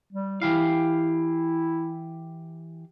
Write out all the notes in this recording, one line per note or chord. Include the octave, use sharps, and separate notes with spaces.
G3
E3 E4 G4 F5